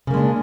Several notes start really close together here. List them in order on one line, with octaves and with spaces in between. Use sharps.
C#3 A#3 G#3 D4